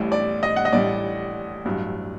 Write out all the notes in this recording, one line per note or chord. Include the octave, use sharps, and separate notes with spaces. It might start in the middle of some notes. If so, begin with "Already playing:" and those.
Already playing: A1 A2 G3
D5
D#5
F#5
D#5
A1 A2 G3 D5
A1 G2 F#3